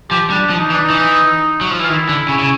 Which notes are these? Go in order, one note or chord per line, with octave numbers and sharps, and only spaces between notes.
F3 G4
G3 D4
F3
D#4
E3
D4
D#4
E3
F#3
F3
E3 F4
D#3 E4
D3
C#3
C#3